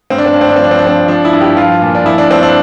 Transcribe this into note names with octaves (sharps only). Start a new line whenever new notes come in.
G2 C4
D4
C4
G2 D4
C4
D4
C4
F3 D4
C4
D4
F3 C4
F3 D4
E4
G2
G4
F3 F4
A#2
D4
F3 E4
D4
G2 C4
D4